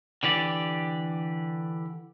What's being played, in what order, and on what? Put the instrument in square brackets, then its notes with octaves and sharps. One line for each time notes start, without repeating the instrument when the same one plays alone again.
[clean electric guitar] D3 E3 G4 D5